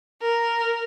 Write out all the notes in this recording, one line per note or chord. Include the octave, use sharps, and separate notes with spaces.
A#4